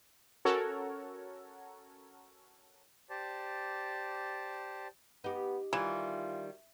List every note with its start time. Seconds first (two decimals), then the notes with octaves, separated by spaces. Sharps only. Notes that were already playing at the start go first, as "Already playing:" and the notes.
0.45 C#4 F#4 A4 A#4 C#5
3.10 G4 C5 D5 A5
5.24 B3 D#4 G4
5.73 D#3 E3 G3 F4